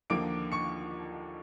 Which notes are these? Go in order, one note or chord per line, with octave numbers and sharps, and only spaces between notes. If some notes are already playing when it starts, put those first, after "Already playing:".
D#2 D3 F3 A#3 D6 D7
C#6 C#7